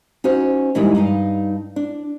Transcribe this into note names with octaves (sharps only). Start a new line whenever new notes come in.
C#4 D#4 F#4 C5
A#2 E3 G3 G#3 D#4 D5
G2 D#4 F5
D4